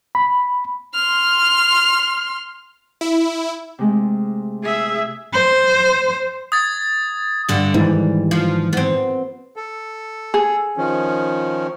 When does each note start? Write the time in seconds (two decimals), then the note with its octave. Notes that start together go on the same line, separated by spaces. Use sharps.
0.15 B5
0.94 C6 F6
3.01 E4
3.79 C3 G#3 A3
4.63 G#4 E5
5.33 C5
6.52 D#6 G#6 A6
7.49 G2 D3
7.74 G#2 D#3 E3 G3
8.31 F3
8.73 B3 C4
9.56 A4
10.34 G#4
10.77 D#3 F3 C#4